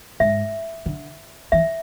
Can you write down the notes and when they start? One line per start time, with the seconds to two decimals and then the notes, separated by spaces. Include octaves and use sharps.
0.20 G#2 E5
0.86 D3
1.52 E3 E5